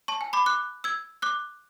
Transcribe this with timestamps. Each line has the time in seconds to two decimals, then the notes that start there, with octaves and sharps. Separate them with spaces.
0.08 A5 C#6
0.21 G#5
0.33 B5 D6
0.46 D6 F#6
0.84 E6 G#6
1.22 D6 F#6